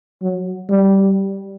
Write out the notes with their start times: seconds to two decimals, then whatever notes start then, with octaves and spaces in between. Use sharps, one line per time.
0.22 F#3
0.69 G3